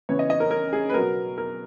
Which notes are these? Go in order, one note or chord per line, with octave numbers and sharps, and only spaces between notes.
C#3 E3 B3 C#5
D#5
D#5
A#4
A#4
G#4
B4
B2 F#3 B3 A#4
A#4